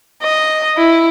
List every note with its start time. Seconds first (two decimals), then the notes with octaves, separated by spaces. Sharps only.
0.22 D#5
0.78 E4